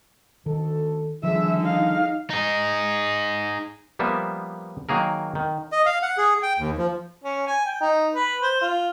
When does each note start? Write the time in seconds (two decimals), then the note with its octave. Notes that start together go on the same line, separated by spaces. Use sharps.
0.46 D2 D#3 A4
1.23 D3 D#3 F3 G3 G#4 E5
1.61 D#4 F5
2.30 D#4 G#4
3.99 F3 G3 A#3 B3 E5
4.89 D#3 F#3 A#3 G#4 A#4
5.35 D#3
5.72 D#5
5.86 F5
6.02 F#5
6.18 G#4
6.43 G5
6.59 D#2
6.78 F3
7.24 C#4
7.47 G#5
7.66 G5
7.81 D#4
8.13 B4
8.42 C5
8.61 F4